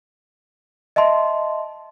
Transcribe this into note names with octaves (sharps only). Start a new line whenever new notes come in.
D#5 E5 A5 C6